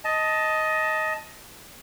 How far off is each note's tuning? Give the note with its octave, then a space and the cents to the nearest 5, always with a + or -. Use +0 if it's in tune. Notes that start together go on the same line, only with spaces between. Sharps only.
D#5 +15 A5 -5